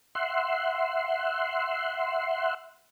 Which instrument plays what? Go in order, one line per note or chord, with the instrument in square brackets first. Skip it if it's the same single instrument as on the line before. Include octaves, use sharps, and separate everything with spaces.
[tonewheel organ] E5 F#5 C6